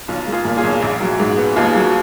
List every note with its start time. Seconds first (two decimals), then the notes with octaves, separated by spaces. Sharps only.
0.08 B1 F4
0.27 G#3
0.32 F4 G#4
0.45 A#2
0.57 F4 G#4
0.63 B1
0.82 A#1
1.00 F#3
1.20 G#2
1.38 B3
1.56 D#2 F4 G#4
1.76 F#3